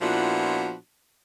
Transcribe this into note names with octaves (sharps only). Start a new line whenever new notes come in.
A#2 F3 B3 D4 E4 F#4